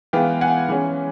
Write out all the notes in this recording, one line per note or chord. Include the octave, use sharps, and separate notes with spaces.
E3 G#3 B3 F5 G5
F#5 G#5
E3 G#3 C#4